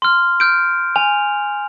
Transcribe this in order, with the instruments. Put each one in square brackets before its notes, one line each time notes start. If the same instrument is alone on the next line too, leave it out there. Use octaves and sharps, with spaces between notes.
[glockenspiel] C6 F6
F6 G6 D7
G#5 F7